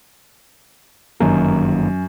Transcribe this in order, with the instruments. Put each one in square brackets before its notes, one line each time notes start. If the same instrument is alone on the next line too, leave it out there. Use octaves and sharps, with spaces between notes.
[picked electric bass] G1 D#3 A#3 [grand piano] F#2